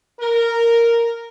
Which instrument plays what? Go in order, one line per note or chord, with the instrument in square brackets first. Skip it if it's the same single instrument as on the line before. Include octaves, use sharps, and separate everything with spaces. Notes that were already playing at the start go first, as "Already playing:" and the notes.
[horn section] A#4